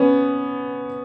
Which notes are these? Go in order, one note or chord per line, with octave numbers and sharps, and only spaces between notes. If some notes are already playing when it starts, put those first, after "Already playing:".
Already playing: B3 C#4